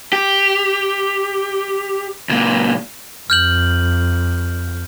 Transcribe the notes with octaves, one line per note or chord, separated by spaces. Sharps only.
G4
C#2 A#2
F2 F6 G6 F#7